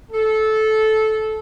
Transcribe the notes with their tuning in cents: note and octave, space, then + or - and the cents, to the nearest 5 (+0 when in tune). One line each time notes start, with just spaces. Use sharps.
A4 -15